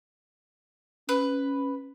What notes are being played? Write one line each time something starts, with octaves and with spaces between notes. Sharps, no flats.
C#4 B4